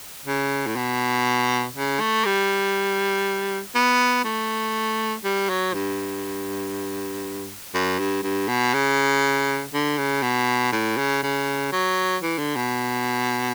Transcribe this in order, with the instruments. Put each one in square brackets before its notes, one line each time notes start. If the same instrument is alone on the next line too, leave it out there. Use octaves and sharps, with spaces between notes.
[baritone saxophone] C#3
A2
B2
C#3
A3
G3
B3
A3
G3
F#3
G2
F#2
G2
G2
B2
C#3
D3
C#3
B2
A2
C#3
C#3
F#3
E3
D3
B2